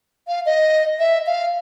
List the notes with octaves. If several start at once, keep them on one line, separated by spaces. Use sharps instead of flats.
F5
D#5
E5
F5